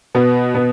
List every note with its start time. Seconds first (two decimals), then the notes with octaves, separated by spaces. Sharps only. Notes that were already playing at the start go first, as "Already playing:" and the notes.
0.15 B2 B3
0.55 B2 B3